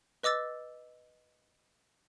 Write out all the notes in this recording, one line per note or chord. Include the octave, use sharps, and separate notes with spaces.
B4 D#5 D6 E6 A6